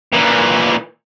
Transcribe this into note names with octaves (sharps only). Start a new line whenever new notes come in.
A#2 E3